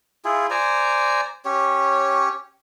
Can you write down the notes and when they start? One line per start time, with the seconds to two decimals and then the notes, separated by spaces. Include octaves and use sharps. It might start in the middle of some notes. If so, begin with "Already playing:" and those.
0.25 E4 F4 G#4
0.50 C5 D5 G#5 A#5
1.45 C#4 G4 C#5